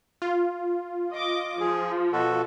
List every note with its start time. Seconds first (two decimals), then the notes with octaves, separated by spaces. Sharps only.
0.22 F4
1.12 D#5 D6
1.60 F3 G#4
2.13 B2 F#4 A4